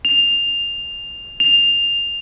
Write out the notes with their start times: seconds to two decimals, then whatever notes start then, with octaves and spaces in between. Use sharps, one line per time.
0.05 F7
1.40 F7